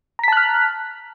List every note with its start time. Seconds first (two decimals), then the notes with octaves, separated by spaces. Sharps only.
0.19 A#5
0.24 B6
0.28 A5
0.33 F#6
0.37 F6